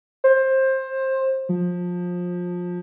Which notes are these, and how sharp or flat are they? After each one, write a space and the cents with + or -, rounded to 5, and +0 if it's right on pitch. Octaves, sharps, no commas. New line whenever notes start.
C5 +20
F3 +25